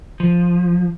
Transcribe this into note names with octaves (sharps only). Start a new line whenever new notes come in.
F3